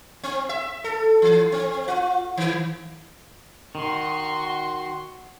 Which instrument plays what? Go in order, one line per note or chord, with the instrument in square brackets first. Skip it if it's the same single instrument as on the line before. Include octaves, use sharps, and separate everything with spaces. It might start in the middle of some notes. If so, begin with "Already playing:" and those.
[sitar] C4
E5
A4
E3
C4
F4
D#3
[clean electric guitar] D#3 [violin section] F#4 C6 C#6